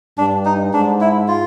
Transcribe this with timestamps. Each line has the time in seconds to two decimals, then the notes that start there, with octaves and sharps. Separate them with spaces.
0.18 G2 D4
0.45 D#4
0.72 G#2 D4
1.01 E4
1.28 F4